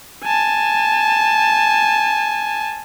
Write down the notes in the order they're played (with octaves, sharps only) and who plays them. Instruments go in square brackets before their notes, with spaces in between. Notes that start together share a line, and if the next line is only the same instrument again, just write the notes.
[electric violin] G#5 A5